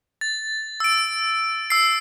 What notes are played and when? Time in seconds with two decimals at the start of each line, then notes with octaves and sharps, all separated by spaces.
0.21 A6
0.80 E6 D7
1.70 E6 C7